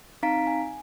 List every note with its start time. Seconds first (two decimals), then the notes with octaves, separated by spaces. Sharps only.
0.22 C4 D#4 F5 A#5 B6 D7
0.47 G#5